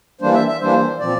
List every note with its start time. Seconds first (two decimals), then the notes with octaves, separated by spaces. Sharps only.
0.21 E3 G3 A#3 D4 C5
0.34 E5
0.48 E5
0.61 E3 G3 A#3 D4 C5
0.99 A#2 F3 C4 D5